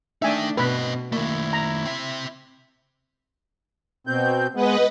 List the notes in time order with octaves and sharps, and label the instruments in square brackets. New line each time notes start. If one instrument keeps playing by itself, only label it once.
[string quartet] A3 D4 D5 [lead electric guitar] D#4 G5 [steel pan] E5 G#5
[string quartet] B2 [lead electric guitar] C4 D#5 [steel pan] B4 B5
[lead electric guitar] D#3 A3 [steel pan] A#3 [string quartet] E4
[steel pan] A#5
[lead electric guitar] C4 E5
[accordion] B2 C4 G6
[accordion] G#3 B3 [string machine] B4 D#5 F#5